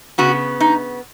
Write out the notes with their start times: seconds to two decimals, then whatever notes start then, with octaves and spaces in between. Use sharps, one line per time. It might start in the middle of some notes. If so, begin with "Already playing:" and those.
0.18 C#3 B3 F#4
0.60 D#4